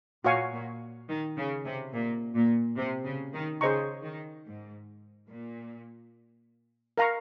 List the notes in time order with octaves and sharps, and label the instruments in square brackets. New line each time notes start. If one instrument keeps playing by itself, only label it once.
[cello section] A#2 [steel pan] F#4 C#5 F5 G#5 C#6
[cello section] A#2
D#3
C#3
C3
A#2
A#2
C3
C#3
D#3
[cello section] C#3 [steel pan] G#4 C5 D#5 A#5 C#6
[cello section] D#3
G#2
A#2
[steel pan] A#4 F5 A#5 C#6